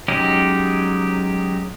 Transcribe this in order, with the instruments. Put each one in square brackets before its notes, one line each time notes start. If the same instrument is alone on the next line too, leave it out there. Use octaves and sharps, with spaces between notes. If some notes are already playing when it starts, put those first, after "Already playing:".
[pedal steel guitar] F#3 G#3 C#4 D#4 G4